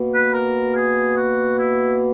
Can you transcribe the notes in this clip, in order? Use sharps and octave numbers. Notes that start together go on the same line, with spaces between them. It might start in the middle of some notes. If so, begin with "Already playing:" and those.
Already playing: B2 A#3
B4
A#4
G#4
F#4
E4